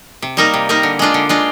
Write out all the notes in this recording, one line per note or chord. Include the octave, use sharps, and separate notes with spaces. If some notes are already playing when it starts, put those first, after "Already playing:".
C3
G3 A#3 D#4 A#4
C3
G3 A#3 D#4 A#4
D3
G#3 D4 F4
D3
G#3 D4 F4